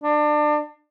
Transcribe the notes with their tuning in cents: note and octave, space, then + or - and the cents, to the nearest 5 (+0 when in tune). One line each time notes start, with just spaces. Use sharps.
D4 +25